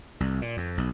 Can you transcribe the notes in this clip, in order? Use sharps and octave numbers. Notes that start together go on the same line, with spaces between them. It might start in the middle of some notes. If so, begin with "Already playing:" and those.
C2
A#2
F2
B1